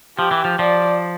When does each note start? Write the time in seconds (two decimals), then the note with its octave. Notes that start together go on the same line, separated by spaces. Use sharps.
0.19 F3 G4
0.31 E3
0.45 F3
0.59 F3 D5